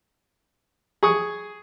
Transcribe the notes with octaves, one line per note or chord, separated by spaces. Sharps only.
G#4 C#6 D#6